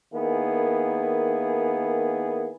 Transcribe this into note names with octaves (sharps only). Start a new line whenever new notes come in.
D#3 A#3 B3 E4 G#4